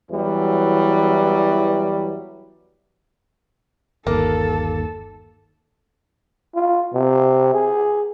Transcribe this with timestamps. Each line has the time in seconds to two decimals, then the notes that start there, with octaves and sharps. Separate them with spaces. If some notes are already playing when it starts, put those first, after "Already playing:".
0.11 E2 E3 F#3 G3
4.07 G1 D#2 A#3 A4
6.55 F4
6.94 C3
7.54 G#4